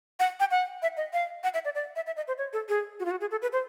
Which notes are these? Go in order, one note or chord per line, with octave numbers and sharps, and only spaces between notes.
F#5
G5
F#5
E5
D#5
F5
F#5
E5
D5
D5
E5
E5
D#5
C5
C#5
A4
G#4
F#4
F4
F#4
G#4
A4
B4
C5